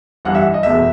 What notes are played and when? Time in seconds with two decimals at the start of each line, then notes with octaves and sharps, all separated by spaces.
0.25 G1 G2 E3 G3 F#5
0.35 E5
0.54 D#5
0.63 F1 E2 B2 G#3 E5